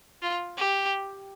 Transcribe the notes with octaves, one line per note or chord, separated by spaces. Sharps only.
F4
G4